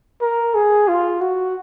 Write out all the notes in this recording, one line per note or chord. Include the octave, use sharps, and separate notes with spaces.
A#4
G#4
F4
F#4